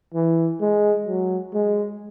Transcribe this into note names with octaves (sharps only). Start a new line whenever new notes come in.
E3
G#3
F#3
G#3